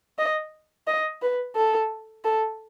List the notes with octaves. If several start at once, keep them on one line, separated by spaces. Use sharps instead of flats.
D#5
D#5
B4
A4
A4